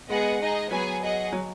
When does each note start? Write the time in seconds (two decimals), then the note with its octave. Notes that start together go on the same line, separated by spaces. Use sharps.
0.09 G#3 B3 G#4 D#5 F#5
0.40 D#4 G#4 D#5
0.71 F#3 B3 G#4 B4 G#5
1.02 G#4 D#5 F#5
1.33 F#3